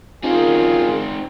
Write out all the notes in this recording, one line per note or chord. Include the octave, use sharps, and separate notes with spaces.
F#2 C4 D#4 F4 G#4 G#5